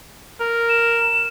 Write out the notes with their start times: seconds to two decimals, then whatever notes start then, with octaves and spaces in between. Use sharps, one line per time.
0.40 A#4
0.69 E7